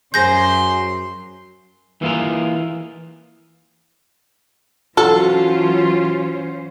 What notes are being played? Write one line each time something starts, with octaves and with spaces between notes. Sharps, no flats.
F#2 F#3 G#4 C5 C6 G6 A#6
E3 A#3 F4 G#4 A#4
E3 F#3 C#4 F4 F#4 A4 C5